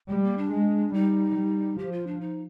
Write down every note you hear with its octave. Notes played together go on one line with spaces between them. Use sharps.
G3 G#3
A#3
D4
G#3
G3 D#4
G3
F3 G4
F4
D4
D#4